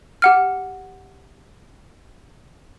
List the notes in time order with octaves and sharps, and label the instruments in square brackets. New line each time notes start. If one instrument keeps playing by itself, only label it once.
[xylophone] G4 F#5 F6